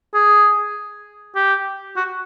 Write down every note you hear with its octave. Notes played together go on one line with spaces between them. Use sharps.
G#4
G4
F#4